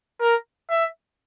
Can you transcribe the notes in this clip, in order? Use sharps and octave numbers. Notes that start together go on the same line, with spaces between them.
A#4
E5